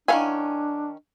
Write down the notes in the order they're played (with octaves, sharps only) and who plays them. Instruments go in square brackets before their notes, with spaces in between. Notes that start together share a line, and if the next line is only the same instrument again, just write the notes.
[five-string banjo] D#3 C#4 G#5 [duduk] D4 [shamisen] E4 F5 F#5